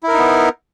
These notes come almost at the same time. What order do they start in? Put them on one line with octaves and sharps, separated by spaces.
E4 A#4 D#4 B3